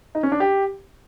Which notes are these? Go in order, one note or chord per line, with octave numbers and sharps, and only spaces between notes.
D#4
C#4
D4
G4